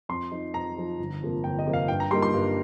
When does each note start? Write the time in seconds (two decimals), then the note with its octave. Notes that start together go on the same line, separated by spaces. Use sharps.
0.09 F2 C6
0.32 F3 D#4
0.54 F2 A#5
0.77 F3 D#4
0.99 G1
1.21 F2 C3 F3 A#3
1.44 G1 G5
1.59 D#5
1.66 F2 C3 F3 A#3
1.73 F5
1.88 G2 G5
2.00 A#5
2.11 G3 A#3 D#4 C6
2.22 C6
2.34 G2